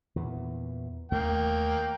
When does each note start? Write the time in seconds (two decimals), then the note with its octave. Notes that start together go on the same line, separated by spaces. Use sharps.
0.16 E2 A#2 E3
1.12 D#2 A3 A#3 G5